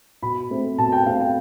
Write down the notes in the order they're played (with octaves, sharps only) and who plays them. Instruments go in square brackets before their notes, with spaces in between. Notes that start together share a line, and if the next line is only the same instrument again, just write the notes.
[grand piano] B2 B5
A3 C4
B2 A5
G5
A3 C4 F5
G5